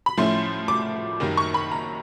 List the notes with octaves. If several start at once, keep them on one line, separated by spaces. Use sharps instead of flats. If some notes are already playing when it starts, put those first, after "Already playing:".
B5
A2 F3 A3 C#4 E4 C6
D6
F#1 F#2 D#3 G3 A#3
C#6
B5
A#5